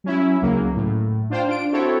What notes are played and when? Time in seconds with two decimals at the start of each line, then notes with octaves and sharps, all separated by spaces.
0.04 F#3 C#4 E4
0.42 C#2 C#3 F#3 A#3
0.76 A2
1.30 D4 F4 C5 F5 G5
1.47 D4 F4 D7
1.72 C4 E4 F#4 A4 C#5